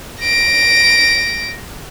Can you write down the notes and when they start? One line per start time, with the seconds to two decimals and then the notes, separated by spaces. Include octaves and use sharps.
0.21 A#6 D7